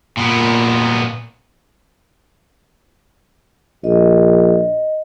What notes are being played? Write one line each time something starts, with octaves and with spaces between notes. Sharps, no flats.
A#2 B3
A#1 D#5